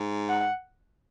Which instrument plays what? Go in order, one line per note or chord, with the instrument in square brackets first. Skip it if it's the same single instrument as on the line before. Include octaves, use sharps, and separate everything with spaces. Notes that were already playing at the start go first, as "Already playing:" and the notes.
Already playing: [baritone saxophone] G#2
[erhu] F#5